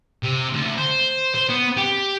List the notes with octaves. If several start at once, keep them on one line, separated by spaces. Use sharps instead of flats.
C3
D2
C5
C5
B3
G4